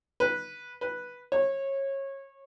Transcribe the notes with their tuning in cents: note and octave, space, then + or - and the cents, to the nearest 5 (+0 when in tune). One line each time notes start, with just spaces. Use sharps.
B4 -15
B4 -10
C#5 -25